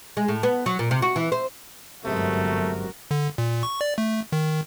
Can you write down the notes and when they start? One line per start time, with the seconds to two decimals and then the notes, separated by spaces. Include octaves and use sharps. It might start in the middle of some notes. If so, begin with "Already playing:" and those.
0.17 G#3
0.28 A2
0.43 B3
0.66 F#3
0.79 A#2
0.91 C3
1.02 F#4
1.16 E3
1.32 C5
2.05 G1 F#2 C3 G#3 A3 F#4 A#4
3.11 D3
3.38 A#2
3.63 C#6
3.81 D5
3.98 A3
4.32 D#3